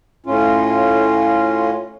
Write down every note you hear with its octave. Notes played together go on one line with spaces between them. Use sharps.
A2 C#4 F4